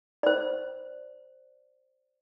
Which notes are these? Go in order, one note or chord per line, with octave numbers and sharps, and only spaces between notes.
C5 D5